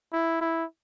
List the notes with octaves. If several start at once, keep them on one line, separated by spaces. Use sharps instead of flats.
E4
E4